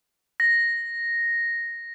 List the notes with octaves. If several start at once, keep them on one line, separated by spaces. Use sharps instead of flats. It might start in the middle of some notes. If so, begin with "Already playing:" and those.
A#6